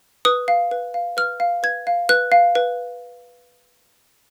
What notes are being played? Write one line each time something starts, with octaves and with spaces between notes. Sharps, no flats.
B4 D#6
F5
B4
F5
B4 F6
F5
B4 G#6
F5
B4 F#6
F5
B4